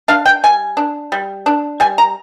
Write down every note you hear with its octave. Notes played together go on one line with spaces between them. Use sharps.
D4 F5
G5
G3 G#5
D4
G3
D4
G3 G#5
A#5